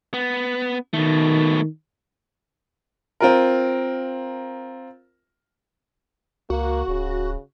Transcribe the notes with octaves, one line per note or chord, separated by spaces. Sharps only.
B3
B2 D#3 A3
C4 F4 A#4
C#2 A#3 F#4
D1 C#3